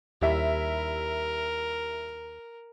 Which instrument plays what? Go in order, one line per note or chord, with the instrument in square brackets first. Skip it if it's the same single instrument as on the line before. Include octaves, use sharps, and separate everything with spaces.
[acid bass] D#2 [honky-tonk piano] G3 E4 E5 [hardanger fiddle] A#4